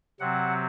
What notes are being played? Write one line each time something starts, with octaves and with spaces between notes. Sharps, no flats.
C3 F#3 C4 F#5